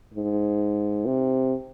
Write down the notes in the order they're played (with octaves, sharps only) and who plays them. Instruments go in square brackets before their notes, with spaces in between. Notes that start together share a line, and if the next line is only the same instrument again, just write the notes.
[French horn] G#2
C3